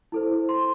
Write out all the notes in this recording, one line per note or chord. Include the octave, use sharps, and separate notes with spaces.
E4 A4 C5
C6